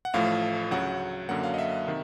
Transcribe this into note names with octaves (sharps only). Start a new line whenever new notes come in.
F#5
A1 A2 F3 A3 F5
D2 C#3 F#3 F#5
F#2 D3 F#3 A#3 F#5
F5
D#5
E5
C3 D#3